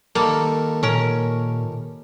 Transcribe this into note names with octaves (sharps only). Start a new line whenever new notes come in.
D#3 G3 A#3 A4
A#2 C#4 A#4